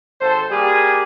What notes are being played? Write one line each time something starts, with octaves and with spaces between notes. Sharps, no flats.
G#1 A4 C5
G3 A#3 G4 G#4